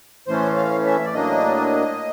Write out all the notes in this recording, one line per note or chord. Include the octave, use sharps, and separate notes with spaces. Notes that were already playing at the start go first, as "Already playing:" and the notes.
A2 E3 A3 C#4 C5
F5
E5
D5
A2 F#3 A#3 D4 D#5